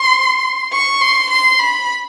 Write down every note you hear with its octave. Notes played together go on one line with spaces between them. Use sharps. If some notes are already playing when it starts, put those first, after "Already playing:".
Already playing: C6
C#6
C6
C6
B5